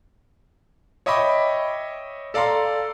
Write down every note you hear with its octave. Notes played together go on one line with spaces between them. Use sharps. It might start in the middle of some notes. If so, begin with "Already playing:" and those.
C#5 D#5 E5 G5 B5 D6
A4 D5 F5 A#5 C6